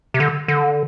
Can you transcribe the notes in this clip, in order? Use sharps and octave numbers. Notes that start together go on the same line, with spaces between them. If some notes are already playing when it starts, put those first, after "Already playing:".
C3
D3
D3